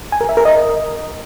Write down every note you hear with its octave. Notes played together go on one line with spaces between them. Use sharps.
G#5
A#4
E5
A#4
D#5